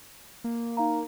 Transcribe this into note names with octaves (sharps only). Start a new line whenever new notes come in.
A#3
D#4 F5 A#5